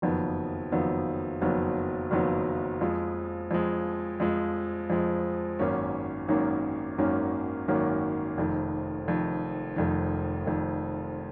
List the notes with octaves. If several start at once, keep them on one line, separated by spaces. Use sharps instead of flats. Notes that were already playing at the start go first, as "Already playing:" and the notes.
F#1 F2 D#3 F#3 B3
F#1 F2 D#3 F#3 B3
F#1 F2 D#3 F#3 B3
F#1 F2 D#3 F#3 B3
F2 F3 G#3
F2 F3 G#3
F2 F3 G#3
F2 F3 G#3
G#1 F#2 D#3 A#3 C#4
G#1 F#2 D#3 A#3 C#4
G#1 F#2 D#3 A#3 C#4
G#1 F#2 D#3 A#3 C#4
F1 F2 D#3
F1 F2 D#3
F1 F2 D#3
F1 F2 D#3